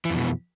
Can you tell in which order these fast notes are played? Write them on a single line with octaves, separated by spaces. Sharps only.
E3 F2 B2